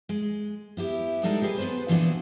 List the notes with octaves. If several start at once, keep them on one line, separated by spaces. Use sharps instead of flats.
G#3
B3 E4 G4
G3 G#3 D#4 A4 F#5
G4 G#4 B4 C5 G#5
B3 B4 C5
A#2 E3 F3 B3 D4 F#4